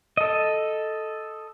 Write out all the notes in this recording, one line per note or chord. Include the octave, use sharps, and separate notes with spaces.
A4 D#5